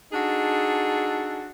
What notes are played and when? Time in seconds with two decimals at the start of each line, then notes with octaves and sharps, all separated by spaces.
0.12 D4 D#4 F#4 G#4 A4